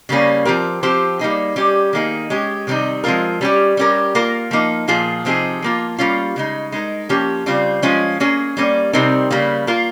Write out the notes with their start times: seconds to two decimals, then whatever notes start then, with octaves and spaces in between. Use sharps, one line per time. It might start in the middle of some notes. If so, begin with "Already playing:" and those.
0.09 C#3 G3 A#3 C#4
0.45 F3 C4 G4 A#4
0.83 F3 C4 G4 C5
1.19 G3 A#3 D#4 G#4
1.56 G3 C#4 G4
1.93 D#3 A#3 D#4 G#4
2.30 G#3 C#4 G4
2.67 C3 D#3 G3 C4 D#4
3.04 F3 G#3 C4 F4 A#4
3.41 G3 C#4 G4
3.77 G3 C#4 G4 A#4
4.15 A#3 F4 A#4
4.51 F3 A#3 D#4
4.88 A#2 F3 A#3 F4 G#4
5.25 C3 F3 C4 D#4 G#4
5.62 F3 A#3 F4
5.98 G3 A#3 C#4 F4
6.36 C#3 G#3 D#4
6.72 G#3 D#4 A#4
7.09 F3 A#3 C#4 G4
7.46 C#3 G3 C4 F4
7.82 F3 G#3 C#4 F4
8.20 A#3 C#4 G#4
8.57 G3 A#3 C#4
8.93 C3 G3 C4 D#4 A#4
9.31 C#3 G3 A#3
9.67 A#3 F4 A#4